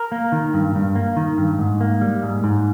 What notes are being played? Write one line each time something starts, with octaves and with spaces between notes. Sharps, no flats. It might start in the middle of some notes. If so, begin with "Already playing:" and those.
Already playing: A#4
A#3
D#3
G2
G2
A#3
D#3
G2
G#2
A#3
G3
G#2
G#2